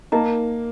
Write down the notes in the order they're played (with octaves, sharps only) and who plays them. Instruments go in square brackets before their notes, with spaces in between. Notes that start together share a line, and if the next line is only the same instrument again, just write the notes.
[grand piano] A#3 [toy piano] D#4 A#4 D#5 A#5